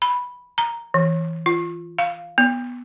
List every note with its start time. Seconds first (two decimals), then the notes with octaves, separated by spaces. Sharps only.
0.02 B5
0.58 A#5
0.94 E3
1.46 F4
1.99 F5
2.38 B3